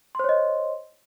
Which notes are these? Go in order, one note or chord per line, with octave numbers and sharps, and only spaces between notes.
C5 C#5 D#5 C6